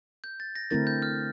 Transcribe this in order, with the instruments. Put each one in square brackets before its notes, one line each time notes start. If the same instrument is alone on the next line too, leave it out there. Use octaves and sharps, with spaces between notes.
[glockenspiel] G6
A6
A#6
[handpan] D3 A3 C4 E4 A#4 [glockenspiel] A6
[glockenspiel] G6
F6